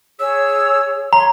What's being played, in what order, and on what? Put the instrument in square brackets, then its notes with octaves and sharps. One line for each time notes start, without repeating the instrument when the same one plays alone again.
[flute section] G#4 C#5 [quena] E6
[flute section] C#5 [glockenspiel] A#5 [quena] C6